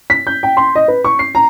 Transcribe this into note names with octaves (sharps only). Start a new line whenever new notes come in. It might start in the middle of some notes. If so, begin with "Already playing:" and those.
B6
G6
G5
C6
D#5
B4
C#6
C7
A#5